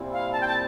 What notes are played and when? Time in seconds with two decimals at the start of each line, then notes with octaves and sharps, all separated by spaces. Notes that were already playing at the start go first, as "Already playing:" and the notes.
Already playing: A#2 G3 C4 E4
0.13 F5
0.32 A5
0.41 G5
0.48 A5